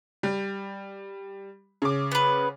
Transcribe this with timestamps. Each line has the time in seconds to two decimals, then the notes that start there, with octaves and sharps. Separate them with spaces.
0.23 G3
1.82 C#3 D6
2.11 B3 B4